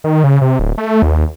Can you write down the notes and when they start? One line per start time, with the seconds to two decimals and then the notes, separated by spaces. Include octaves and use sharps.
0.04 D#3
0.24 C#3
0.41 C3
0.59 D1
0.78 A3
1.02 D#2